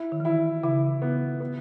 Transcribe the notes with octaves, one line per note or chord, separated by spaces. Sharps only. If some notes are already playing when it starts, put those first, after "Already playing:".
Already playing: E4
D#3
E3
D#3 E4
D#3
C#3 E4
B3
B3